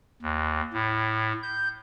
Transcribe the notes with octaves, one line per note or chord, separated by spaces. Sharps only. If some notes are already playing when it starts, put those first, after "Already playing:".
D#2
A2
G6